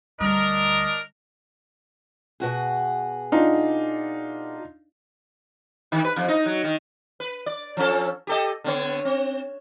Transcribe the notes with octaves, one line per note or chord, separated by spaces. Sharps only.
D2 G3 D4 A#4 D#5
B2 F#4 G#4
D4 D#4 F4
D#3
B4
F2
D#4
F#3
D#3
B4
D5
F3 C#4 A4
G4 A4 D#5
D3 B3 C#5
C4